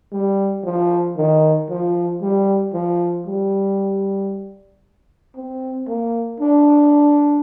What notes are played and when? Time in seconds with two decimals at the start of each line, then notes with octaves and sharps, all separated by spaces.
0.12 G3
0.64 F3
1.16 D#3
1.69 F3
2.22 G3
2.74 F3
3.27 G3
5.36 C4
5.88 A#3
6.40 D4